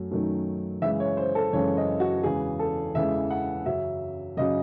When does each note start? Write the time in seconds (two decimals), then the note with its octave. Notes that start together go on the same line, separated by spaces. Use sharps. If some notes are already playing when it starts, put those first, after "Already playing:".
Already playing: F#2 F#3 A3
0.11 F#2 D#3 F#3 A3
0.82 F#2 C#3 E3 G#3 E5
1.00 C#5
1.17 C5
1.35 A4
1.53 F#2 C#3 E3 G#3 C#5
1.77 D#5
2.00 F#4
2.23 E2 C#3 E3 G#3 G#4
2.59 A4
2.94 E2 C#3 E3 G#3 E5
3.31 F#5
3.66 F#2 C#3 F#3 E5
4.37 F#2 C#3 F#3 D#5